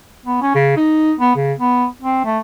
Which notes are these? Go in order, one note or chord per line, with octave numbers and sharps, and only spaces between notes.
B3
C#4
C#3
D#4
B3
C#3
B3
C4
A3